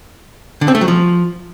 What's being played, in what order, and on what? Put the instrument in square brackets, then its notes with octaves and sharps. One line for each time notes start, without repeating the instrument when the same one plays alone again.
[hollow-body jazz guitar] D3
C4
A3
F#3
F3